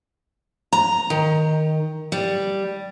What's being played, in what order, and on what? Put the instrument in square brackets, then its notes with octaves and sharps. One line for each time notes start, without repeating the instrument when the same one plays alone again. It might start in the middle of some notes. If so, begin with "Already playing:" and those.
[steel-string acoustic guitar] A#5
D#3
G3